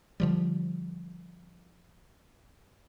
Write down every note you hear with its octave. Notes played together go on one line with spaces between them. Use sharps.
D3 F3 G3